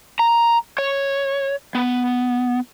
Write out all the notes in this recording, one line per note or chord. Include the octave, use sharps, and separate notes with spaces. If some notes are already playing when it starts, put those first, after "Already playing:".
A#5
C#5
B3